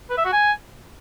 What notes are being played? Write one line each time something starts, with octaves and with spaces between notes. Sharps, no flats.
B4
E5
F#4
G#5